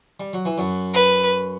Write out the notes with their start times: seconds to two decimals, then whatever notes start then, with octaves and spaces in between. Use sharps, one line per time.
0.20 G3
0.33 F#3
0.45 E3
0.58 F#2 F#3
0.94 B4